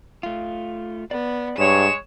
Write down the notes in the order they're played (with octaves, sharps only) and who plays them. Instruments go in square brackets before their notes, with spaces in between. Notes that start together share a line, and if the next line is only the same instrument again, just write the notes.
[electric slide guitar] A3 F4
[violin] B3 [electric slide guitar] D5
[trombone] G2 [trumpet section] G#3 C#5 [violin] E7